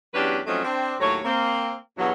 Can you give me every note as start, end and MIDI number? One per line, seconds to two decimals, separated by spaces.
0.13 0.39 40
0.13 0.39 54
0.13 0.39 61
0.13 0.39 62
0.13 0.39 67
0.13 0.39 71
0.46 0.62 53
0.46 0.62 54
0.46 0.62 57
0.46 0.62 60
0.46 0.62 61
0.46 0.62 63
0.65 0.94 60
0.65 0.94 62
0.99 1.18 39
0.99 1.18 45
0.99 1.18 54
0.99 1.18 73
1.24 1.74 58
1.24 1.74 60
1.98 2.12 40
1.98 2.12 43
1.98 2.12 47
1.98 2.12 54